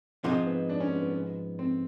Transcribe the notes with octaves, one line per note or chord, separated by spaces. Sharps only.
G#2 F3 G#3 C4
B3
D4
C#4
B3
B3
B3
C4